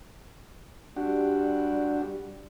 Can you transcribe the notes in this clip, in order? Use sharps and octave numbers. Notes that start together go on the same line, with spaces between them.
G3 D4 F#4 G4